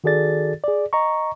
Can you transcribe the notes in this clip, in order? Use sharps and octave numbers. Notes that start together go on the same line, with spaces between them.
D#3 F#4 G#4 A4 D5 A6
G#4 D5
D#5 A#5 C#6